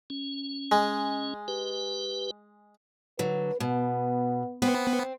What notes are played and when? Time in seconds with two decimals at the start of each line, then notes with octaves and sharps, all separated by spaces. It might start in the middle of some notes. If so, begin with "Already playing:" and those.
0.10 C#4
0.72 G#3
1.48 G4 B4
3.19 D3 F#3 B4
3.60 B2 B3
4.62 B3 C4